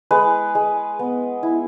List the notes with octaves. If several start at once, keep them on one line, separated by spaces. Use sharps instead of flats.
G#3 B4
G#3
B3
E4